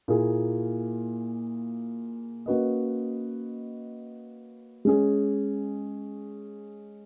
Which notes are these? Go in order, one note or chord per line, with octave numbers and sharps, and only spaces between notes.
A#2 A#3 E4 G#4
A#3 C#4 F#4 B4 D#5
G#3 C#4 G#4